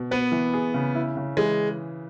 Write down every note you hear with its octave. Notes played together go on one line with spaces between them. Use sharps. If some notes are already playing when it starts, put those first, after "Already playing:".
Already playing: B2
B3 B4
E3
G#4
C#3
E4
C#3
E3 G#3